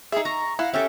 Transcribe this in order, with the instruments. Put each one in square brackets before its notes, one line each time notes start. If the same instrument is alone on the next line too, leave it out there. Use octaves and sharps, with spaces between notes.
[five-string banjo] D#4 E5 [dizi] G#4
[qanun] A#5 [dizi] C#6
[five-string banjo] E4 [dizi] F5 [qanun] F#5
[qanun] C#4 G4 A4 [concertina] E5 [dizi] G5